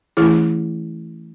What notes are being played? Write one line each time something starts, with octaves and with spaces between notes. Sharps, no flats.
E3 A3 C#4 E4 G#4